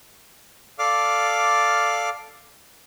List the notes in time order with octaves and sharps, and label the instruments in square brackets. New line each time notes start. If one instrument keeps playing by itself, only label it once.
[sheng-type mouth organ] A4 D5 F5 D6 F6